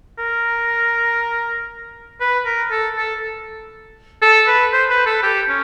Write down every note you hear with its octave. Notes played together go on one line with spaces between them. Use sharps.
A#4
B4
A#4
A4
A4
A4
B4
C5
B4
A4
G4
C#4